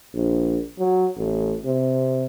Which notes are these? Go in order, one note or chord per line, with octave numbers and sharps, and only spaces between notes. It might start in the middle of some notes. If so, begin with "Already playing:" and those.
A#1
F#3
A1
C3